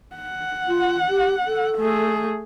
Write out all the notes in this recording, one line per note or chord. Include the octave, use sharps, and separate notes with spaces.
F#5
F4
G4
A4
A3 G#4